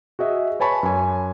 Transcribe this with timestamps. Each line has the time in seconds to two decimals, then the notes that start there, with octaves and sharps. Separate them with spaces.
0.19 F#4 G#4 D#5 E5
0.60 B4 C#5 G#5 A5 B5 C#6
0.83 F#2 G#5